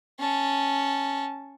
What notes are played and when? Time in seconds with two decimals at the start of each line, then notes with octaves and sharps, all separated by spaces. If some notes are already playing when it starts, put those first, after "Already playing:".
0.19 C#4 A5